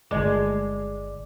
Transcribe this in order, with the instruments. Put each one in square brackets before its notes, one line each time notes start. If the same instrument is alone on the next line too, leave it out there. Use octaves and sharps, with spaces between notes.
[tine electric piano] G1 D5 D6 [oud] G#3